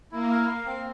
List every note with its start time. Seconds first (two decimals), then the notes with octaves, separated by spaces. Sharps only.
0.12 A#3 E4
0.30 A#4
0.48 F5
0.66 C4